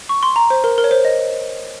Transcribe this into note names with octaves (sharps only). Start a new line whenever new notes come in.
C#6
C6
A#5
C5
A#4
A#4
C#5
C5
D#5